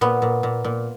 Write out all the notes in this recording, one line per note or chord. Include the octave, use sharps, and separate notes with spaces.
A#2 B3
A#2
A#2
A#2